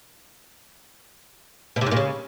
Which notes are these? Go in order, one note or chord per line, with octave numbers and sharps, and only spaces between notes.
B2
C3
G#2
A#2
C#3